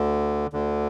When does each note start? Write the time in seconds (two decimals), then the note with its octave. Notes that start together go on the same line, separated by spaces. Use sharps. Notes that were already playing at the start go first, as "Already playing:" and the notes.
Already playing: D2 D3
0.53 D2 D3